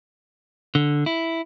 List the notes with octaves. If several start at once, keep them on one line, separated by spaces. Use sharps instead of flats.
D3
E4